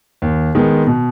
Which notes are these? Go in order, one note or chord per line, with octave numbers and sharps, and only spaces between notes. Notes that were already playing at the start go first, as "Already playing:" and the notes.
D#2
D#3 G#3 B3
B2